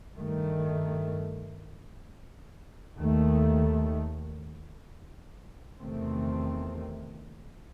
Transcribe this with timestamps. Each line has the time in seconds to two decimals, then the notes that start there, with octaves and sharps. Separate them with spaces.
0.14 G2 D#3 A3
2.97 D#2 D#3 A3
5.79 E2 C3 D#3 A3 C4